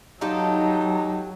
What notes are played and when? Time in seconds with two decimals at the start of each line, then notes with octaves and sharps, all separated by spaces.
0.21 F#3 D#4 F4 G4 A4 A5